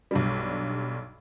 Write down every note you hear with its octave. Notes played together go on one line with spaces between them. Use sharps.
B1 G2 G3